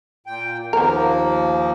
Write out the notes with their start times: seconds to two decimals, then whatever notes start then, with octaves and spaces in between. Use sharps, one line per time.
0.27 A#2 G5
0.73 D#2 F3 A#3 B3 A#4